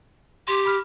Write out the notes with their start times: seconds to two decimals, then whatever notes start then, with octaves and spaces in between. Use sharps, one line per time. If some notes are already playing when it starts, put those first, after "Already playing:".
0.48 G4 C6
0.66 B5 F6